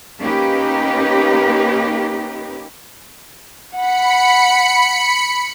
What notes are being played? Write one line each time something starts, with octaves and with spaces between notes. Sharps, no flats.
A#3 C#4 D#4 G4 B4
F#5 B5 C#7